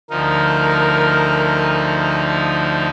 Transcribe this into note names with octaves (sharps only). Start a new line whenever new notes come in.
D2 F3 D#4 A#4